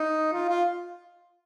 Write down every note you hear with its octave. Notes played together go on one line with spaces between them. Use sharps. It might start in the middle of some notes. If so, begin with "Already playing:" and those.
Already playing: D#4
F4
F4